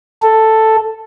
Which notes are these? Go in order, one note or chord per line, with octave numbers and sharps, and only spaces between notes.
A4